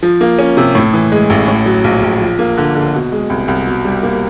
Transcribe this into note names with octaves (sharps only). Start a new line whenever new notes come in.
F3
A#3
C#4
C3
A2
E3
G#3
A1
A2
F#3
A#1
A#1
F3
A#3
D3
D3
B2
G#3
C2
C2
B2
G3
A#3